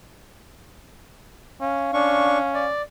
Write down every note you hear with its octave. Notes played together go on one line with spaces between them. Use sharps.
C#4 F5
C#4 D4 C#6
D5